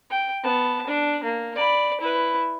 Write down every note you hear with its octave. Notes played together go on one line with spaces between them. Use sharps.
G5
B3 A5
D4
A#3
D5 B5
E4 B4